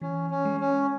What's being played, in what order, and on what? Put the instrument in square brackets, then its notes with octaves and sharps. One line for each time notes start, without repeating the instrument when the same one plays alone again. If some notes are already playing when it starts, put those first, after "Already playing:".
[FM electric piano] E3 [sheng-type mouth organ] C#4
[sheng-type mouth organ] C#4
[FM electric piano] G#3
[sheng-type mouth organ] C#4